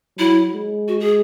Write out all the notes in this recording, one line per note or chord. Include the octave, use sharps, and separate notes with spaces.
F#3 E4
G#3
F#4
G#4